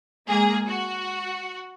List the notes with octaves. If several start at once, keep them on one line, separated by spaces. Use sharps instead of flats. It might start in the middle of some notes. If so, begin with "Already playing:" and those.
G#3 A#3 G#4
F#4